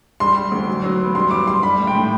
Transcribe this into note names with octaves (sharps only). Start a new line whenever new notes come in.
G3 C6
G3
D2
F#3
F#3
B3
G3 C6
B3 D6
G3 C6
G3 B5
A2
G5
A2